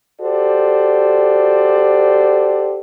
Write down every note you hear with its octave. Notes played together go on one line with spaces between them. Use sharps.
F#4 G4 A4 C5 D5